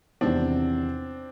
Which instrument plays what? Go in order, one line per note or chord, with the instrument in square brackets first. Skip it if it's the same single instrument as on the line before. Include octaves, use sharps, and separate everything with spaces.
[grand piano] E2 C3 D#3 [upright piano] C4 D4